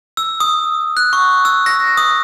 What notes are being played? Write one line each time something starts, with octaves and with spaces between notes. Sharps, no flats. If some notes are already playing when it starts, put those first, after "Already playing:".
E6
D#6
F#6
C#6
E6
A#6
D#6